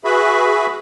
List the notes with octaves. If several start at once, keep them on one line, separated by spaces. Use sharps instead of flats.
F#4 G#4 B4 E5 B5